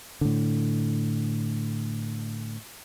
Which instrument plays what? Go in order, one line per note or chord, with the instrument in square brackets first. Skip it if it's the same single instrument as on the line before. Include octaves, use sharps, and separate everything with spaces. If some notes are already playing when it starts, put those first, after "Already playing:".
[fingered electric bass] A2 D3